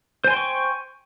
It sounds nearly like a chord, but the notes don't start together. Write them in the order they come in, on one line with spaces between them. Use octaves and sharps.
C5 G#5 C6 G5 C#6